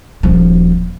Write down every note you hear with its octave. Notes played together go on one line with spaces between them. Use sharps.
D#1 F3